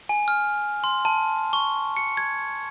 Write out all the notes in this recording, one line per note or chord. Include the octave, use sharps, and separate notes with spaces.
G#5
F6
C6
A5
C#6
C#7
G#6